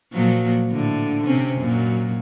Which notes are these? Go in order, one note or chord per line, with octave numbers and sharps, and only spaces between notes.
A#2 F3 F#3
A2 D3
C3 C4 C#4
F#2 A#2 F#3